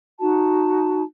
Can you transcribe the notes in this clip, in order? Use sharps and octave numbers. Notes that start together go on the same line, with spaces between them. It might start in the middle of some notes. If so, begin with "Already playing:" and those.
D#4 F#4 A5